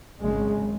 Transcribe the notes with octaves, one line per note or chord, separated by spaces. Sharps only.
G#1 F#2 C#3 G#3